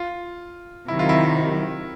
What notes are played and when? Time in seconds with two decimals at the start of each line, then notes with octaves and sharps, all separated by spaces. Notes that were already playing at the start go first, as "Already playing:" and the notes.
Already playing: F4
0.88 C3 D#3 F#3 E4
0.99 F4
1.09 E4